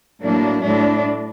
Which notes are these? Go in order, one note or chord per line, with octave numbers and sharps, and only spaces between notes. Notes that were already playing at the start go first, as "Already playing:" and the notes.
A2 F#3 A#3 D4
A2 A3 D4